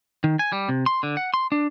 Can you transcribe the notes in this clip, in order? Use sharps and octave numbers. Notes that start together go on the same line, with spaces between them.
D#3
G#5
G3
C3
C6
D3
F#5
C6
D4